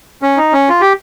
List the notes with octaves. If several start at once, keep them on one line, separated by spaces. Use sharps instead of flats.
C#4
D#4
C#4
F4
G4